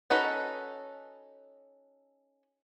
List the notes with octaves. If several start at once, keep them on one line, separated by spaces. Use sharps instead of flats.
C#4 D#4 F#4 A4 B4